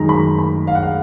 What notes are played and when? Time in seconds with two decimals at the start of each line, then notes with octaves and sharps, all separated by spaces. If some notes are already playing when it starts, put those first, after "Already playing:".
Already playing: F#2 D#3 G#3 A#5
0.09 B5
0.38 B5
0.67 F5
0.75 F#5
0.83 F5